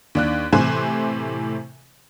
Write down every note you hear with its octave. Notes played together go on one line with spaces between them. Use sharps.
D#2 D4 F#6
A2 C3 E3 C5 G#5 F#6